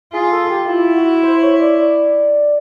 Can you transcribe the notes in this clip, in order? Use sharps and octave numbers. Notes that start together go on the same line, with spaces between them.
F4 G#4
A4
G4
E4 F4
F#4
C5
C#5
D5
D5